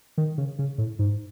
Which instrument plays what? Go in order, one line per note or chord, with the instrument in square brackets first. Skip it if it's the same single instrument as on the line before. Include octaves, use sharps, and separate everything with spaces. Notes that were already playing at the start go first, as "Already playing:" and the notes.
[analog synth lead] D#3
C#3
C#3
A2
G#2